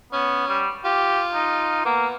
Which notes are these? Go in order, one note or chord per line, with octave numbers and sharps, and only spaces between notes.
B3 C#4
G3
F4 G4
D#4
A#3 B3